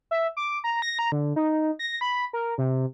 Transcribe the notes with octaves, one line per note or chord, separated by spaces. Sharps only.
E5
D6
A#5
A#6
A#5
D3
D#4
A#6
B5
A#4
C3